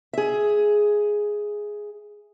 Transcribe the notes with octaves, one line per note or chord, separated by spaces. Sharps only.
G#4 E5